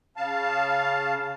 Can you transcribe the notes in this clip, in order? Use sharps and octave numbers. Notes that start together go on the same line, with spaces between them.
C#3 F5 A5